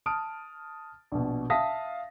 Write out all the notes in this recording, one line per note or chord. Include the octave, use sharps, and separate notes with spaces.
A5 D#6 F6 D7
A#1 B2
E5 F5 A5 D#6 A#6 B6